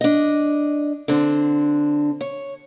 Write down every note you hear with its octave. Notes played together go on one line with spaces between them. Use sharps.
D4 D#5
D3 C4 D4
C#5